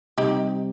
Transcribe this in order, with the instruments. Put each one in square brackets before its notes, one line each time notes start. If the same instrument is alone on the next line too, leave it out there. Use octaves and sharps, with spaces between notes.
[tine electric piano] C3 G3 C4 [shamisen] D#4 G4